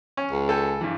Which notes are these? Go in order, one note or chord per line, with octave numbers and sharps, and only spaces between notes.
C#4
C#2
A4 G5 G#5
G2 E3